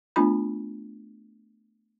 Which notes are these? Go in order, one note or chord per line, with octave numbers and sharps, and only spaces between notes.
A3 B3 D4 F4 B5